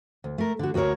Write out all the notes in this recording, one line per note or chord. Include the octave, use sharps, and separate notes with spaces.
D2
A3 A#4
D3 F#4
D2 F#4 G#4 A#4 C#5